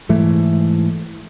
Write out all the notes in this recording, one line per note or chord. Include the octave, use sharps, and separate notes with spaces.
G#2 E3 A3